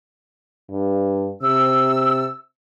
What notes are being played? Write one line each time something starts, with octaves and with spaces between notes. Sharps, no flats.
G2
C3 E6